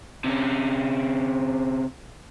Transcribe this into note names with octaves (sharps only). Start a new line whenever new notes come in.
C3 C#4